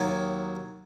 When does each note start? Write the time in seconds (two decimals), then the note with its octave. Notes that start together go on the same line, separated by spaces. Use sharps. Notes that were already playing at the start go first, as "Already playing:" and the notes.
Already playing: D#2 D#3 F#3